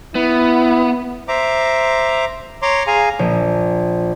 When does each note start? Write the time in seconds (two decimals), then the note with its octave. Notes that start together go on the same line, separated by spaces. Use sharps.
0.15 B3 E4
1.28 C5 E5 A#5 D6
2.62 C#5 A#5 C6 D6
2.87 G#4 F5 G#5 A#5
3.19 A#1